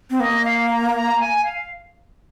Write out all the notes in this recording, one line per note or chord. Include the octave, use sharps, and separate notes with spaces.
C4
A#3 D#5
F5
A#5
A#5
G#5
F5